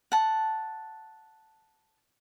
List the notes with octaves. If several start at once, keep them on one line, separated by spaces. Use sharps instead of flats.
F#5 A5